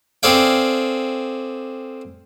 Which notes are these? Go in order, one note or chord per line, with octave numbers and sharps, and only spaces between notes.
C4 G#4 A4 D5 F5 G5